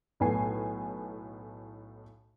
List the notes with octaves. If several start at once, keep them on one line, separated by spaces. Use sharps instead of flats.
B1 A2 B3 G#5 C7